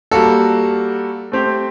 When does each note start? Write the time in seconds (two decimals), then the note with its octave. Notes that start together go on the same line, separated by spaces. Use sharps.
0.11 G3 A#3 F#4 A4
1.32 A3 C4 G4